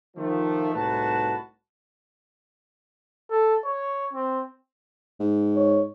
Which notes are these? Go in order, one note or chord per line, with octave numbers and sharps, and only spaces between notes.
D#3 F3 A3
C2 A2 D#4 F#4 B4 A5
A4
C#5
C4
G#2
C#5